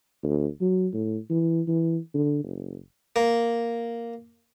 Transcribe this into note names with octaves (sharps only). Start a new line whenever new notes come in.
D2
F#3
A2
E3
E3
D3
F#1
A#3